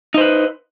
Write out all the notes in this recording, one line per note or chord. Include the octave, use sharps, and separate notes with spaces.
D#4 B4 C5